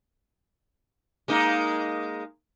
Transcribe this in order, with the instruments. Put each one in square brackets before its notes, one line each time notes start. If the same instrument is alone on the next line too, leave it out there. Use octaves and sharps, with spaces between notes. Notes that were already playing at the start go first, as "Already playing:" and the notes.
[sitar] G#3 A#3 D#4